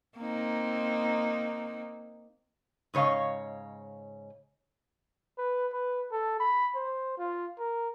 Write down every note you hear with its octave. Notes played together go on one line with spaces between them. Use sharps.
A#3 C4 D#4
G#2 C#3 C#5 D#5 F5
B4
B4
A4
B5
C5
F4
A#4